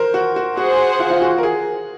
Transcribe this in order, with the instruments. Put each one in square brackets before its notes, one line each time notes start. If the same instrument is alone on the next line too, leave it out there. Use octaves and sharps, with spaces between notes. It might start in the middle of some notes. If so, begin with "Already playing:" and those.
Already playing: [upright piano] A#4 C5
F#4
F#4
[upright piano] F#4 [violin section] G#4 C5 F#5
[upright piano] F4
F4
F#4
A#4
G#4